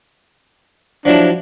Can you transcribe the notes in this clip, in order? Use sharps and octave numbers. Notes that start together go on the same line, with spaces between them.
F3 F#3 D4 E4